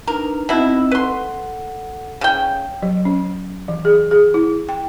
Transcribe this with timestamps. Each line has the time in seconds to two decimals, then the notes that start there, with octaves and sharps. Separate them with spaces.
0.07 D4 D#4 A#4 B4
0.49 B2 C4 D#4 E4 D#5
0.91 A4 B4 F#5 C6
2.21 C#3 G5
2.83 F#3
3.05 C#4
3.68 E3
3.85 G#4
4.11 G#4
4.34 E4
4.69 G5